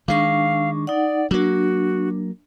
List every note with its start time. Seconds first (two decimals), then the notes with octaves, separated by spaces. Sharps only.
0.08 D#3 G#3 D4 F5 C#6
0.87 D#4 D5 F#5
1.31 F#3 A#3 D4 F#4